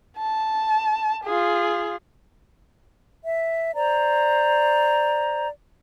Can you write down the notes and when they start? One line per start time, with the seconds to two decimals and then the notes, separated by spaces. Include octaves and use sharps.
0.18 A5
1.24 F4 G#4
3.24 E5
3.75 C5 D5 A#5